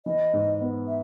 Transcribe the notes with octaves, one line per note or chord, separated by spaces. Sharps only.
E3 D#5
G#2
B3
E5